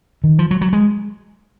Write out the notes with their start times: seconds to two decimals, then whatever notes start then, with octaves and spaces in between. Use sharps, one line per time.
0.24 D#3
0.39 F3
0.51 F#3
0.61 F#3
0.73 G#3